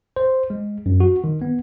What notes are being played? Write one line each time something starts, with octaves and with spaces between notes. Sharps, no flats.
C5
G#3
F#2
F#4
D#3
B3